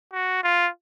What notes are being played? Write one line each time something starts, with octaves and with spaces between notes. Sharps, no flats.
F#4
F4